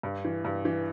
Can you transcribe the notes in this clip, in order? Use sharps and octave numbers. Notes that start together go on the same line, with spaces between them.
G2
E3
G2
E3